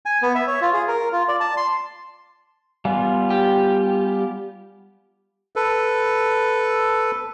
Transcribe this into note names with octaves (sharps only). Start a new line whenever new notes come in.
G#5
B3
E5
C#5
F4
G#4
A#4
F4
D5
A5
C6
G3 B3 F4 F5 F#5 G#5
G4
A4 B4